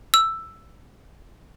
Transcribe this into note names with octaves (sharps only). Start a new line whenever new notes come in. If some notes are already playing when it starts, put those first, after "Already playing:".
E6